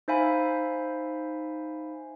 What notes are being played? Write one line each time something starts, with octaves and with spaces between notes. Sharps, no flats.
D#4 C5 E5 F5 G#5 B5